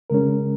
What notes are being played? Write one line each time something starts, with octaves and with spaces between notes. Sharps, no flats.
C#3 G#3 C#4 A#4